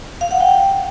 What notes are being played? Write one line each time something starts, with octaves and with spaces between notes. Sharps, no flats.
F5
F#5
G5